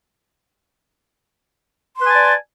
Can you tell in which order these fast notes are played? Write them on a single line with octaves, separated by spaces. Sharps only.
C6 B4 G#5 A5 D5